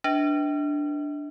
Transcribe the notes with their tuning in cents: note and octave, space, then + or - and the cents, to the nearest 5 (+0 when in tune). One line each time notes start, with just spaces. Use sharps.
D4 +0 B4 +0 E5 -40